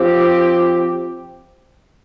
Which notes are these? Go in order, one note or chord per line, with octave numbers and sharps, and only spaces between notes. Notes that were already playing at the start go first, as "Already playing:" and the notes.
Already playing: F3 C4 G4